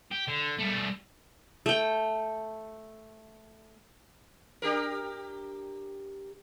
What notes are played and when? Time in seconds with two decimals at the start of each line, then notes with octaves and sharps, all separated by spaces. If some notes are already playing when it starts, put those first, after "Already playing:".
0.11 G4
0.28 D3
0.58 G3 A3
1.66 A3 G5
4.62 D4 G4 A#4